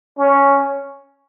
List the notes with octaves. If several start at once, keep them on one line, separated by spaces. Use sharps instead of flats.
C#4